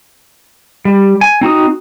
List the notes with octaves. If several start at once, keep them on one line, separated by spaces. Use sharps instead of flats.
G3
G#5
C4 D#4 F#4 D#6